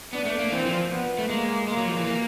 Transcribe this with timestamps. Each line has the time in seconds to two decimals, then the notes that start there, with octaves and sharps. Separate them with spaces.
0.13 B3 D4
0.25 A3
0.38 A#3
0.52 E3 C4
0.65 F3
0.91 B3
1.19 A3
1.29 G#3 A#3
1.68 G#3 A#3
1.77 F#3
1.88 F3
1.97 E3
2.06 A#3